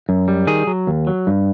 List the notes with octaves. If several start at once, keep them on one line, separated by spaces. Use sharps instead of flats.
F#2
G3
D#3 G#4
F#3
D#2
F#3
G2